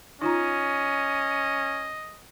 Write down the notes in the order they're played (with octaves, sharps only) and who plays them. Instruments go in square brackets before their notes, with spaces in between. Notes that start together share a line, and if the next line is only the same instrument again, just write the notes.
[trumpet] C#4 [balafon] D#4 F4 A#5 [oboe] D#5